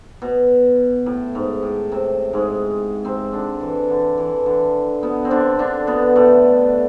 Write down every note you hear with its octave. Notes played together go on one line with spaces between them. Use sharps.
B2
A2
G#2
A2
C3
G#2 G#3
C3 C4
D3 D4
E3
D3
E3
D3
B2 B3
C4
D3 D4
D3 D4
B2 B3
A2 A3